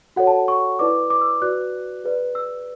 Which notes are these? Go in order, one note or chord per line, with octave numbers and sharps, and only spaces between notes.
F#4 A4 C#5 F#5
A5
C#6
E4 B4 D5 D6
D6
E6
F#4 B4 D5 F#6
G#4 B4 D5
E6